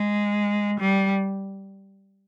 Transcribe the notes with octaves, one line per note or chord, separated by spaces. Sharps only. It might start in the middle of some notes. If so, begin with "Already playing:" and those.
Already playing: G#3
G3